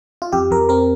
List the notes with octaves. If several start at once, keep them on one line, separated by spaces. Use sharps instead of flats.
F4
F2 G4
F2 A#4
C4 A#4